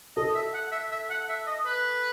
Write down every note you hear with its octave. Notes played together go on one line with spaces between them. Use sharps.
A4 D#5
E5
F#5
E5
E5
F#5
E5
D#5
B4